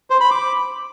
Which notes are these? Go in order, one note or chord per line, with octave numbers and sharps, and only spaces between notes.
C5
B5
D6